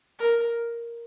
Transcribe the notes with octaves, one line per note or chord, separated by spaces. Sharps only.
A#4